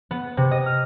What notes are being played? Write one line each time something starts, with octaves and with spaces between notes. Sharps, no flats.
B3
C3
D#5
F6